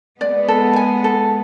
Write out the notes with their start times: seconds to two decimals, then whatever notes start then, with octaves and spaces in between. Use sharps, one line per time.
0.21 G#3 B3 D5
0.48 A4
0.76 G#5
1.04 A4